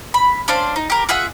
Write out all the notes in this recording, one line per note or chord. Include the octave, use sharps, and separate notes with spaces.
B5
C#4 D4 C5 F5
D#4
G4 A#4
F4 G#4 E5 F#5